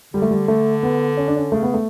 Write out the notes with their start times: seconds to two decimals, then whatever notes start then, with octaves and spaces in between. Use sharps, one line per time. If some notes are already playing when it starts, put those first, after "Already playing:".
0.14 D3 G3
0.22 A3
0.31 G3
0.48 A3
0.83 B3
1.17 C#4
1.28 D4
1.36 C#4
1.52 C#3 A3
1.62 B3
1.74 A3